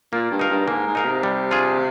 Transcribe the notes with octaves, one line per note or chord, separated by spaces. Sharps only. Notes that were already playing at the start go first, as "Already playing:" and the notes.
A#2 A#3
G2
D#4 A#4 F5
G2
G#2 A#3
G#2
D#4 A#4 F5
C3
G3
D4 F4 G#4